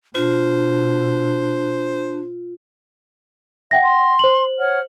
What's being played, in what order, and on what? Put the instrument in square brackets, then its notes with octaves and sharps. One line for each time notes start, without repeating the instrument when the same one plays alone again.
[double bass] B2 [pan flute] D4 [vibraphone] F4 [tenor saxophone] C5
[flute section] E5 [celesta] F#5 G5 A#6
[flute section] C6
[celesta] C5 F#7
[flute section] C#5 F#5 F6